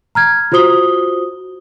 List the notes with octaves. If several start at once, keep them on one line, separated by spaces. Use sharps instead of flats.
A#5 F6 G#6
F4 F#4 C5 D#6 G7